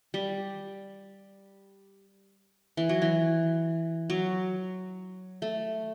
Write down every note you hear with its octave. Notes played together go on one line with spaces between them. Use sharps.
G3
E3
F#3
E3
F#3
A3